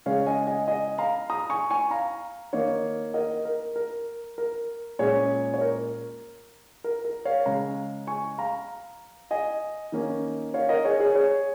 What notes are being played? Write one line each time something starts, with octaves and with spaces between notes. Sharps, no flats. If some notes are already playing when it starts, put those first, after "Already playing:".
C#3 G#3 C#4 C#5 F5
D#5 G#5
D#5 G#5
D#5 G#5
F5 A#5
A#5 D#6
G#5 C#6
G#5 C#6
F5 A#5
D#3 A#3 D#4 C#5 F5
A#4 D#5
A#4
A#4
A#4
A#2 G#3 C#4 G#4 C#5
C#5
A#4
A#4
A#4
C#5 F5
C#3 G#3 C#4 F5 A#5
G#5 C#6
F5 A#5
D#5 G#5
D#3 A#3 C#4
C#5 F5
A#4 D#5
G#4 C#5
G#4 C#5
G#4 C#5